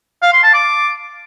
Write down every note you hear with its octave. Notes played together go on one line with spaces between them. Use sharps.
F5
C6
A5
D6